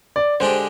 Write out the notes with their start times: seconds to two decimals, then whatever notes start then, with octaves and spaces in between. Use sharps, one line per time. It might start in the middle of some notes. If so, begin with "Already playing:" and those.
0.16 D5
0.40 D3 G#3 D4 G4 C5